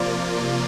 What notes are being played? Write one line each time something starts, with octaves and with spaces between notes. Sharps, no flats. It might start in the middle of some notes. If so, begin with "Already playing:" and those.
Already playing: C3 F3 A#3 F4 D5